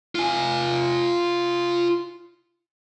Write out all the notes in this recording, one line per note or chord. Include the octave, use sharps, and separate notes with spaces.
F4 G#5